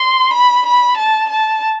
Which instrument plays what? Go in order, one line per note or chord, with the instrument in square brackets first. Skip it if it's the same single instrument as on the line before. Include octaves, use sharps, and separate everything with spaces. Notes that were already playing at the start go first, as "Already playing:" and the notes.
Already playing: [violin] C6
B5
B5
A5
A5